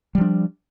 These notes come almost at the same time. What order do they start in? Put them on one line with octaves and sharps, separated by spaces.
G3 F3 D4